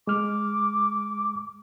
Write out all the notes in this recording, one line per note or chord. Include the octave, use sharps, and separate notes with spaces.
G#3 D6 F6